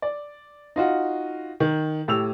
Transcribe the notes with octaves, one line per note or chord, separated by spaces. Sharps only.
D5
D#4 F4 F#4
D#3
A2 G4 E6 F7